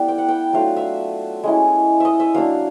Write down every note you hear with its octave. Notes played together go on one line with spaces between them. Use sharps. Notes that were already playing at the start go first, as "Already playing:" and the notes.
Already playing: G3 A3 B3 E4 D5
G5
F#5
G5
F#3 A3 D4 F4 F5
E5
G#3 C#4 E4
D#5 E5
E5
F#3 A#3 D4 F5